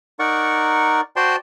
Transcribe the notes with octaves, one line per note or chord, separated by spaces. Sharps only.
D#4 A#4 D5 F#5 C#6
F#4 C5 D5 G5 A5 C6